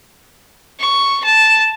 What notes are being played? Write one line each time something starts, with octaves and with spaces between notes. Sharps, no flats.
C#6
A5